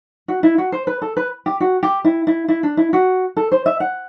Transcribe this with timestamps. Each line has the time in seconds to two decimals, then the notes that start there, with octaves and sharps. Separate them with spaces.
0.28 F#4
0.43 E4
0.58 F#4
0.72 C5
0.87 B4
1.02 A4
1.17 B4
1.46 G4
1.60 F#4
1.83 G4
2.04 E4
2.27 E4
2.48 E4
2.63 D4
2.77 E4
2.93 F#4
3.37 A4
3.52 C5
3.66 E5
3.80 F#5